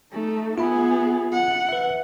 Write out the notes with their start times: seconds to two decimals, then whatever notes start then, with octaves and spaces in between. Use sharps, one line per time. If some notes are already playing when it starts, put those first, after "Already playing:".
0.13 A3 D#4
0.58 B3 F4 G#4 E5 B5
1.32 F#5
1.69 B4 E5